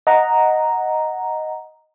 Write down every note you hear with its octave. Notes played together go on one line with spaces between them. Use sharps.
D#5 F#5 A#5